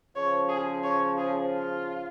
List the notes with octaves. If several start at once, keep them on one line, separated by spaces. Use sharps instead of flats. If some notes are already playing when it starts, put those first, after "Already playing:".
C#3 F3 C#5
G#4
C#5
G#4
F4